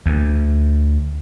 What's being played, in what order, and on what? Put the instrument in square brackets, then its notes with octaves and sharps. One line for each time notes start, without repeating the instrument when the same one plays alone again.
[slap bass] D2